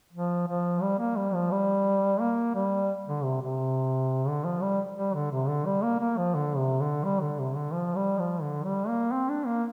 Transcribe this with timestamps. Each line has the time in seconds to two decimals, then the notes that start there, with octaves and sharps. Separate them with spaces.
0.13 F3
0.48 F3
0.82 G3
0.99 A#3
1.17 G3
1.34 F3
1.51 G3
2.21 A#3
2.55 G3
3.07 D3
3.24 C3
3.41 C3
4.28 D3
4.45 F3
4.62 G3
4.97 G3
5.14 D3
5.32 C3
5.49 D3
5.66 G3
5.83 A#3
6.00 A#3
6.18 F3
6.35 D3
6.57 C3
6.81 D3
7.05 G3
7.21 D3
7.39 C3
7.55 D3
7.73 F3
7.96 G3
8.19 F3
8.42 D3
8.65 G3
8.88 A#3
9.12 C4
9.29 D4
9.46 A#3